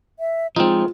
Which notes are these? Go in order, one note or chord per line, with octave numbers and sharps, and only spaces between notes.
E5
F3 G#3 C4 D#4 F4 C5